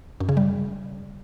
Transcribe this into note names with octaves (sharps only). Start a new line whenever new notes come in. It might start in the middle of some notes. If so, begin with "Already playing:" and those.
F#2
C#3
G3